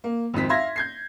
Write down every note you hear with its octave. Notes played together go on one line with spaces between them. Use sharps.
A#3
G#1 F2 C4 B6
E5 F5 C6 G#6 A#6
G6 G#6 C7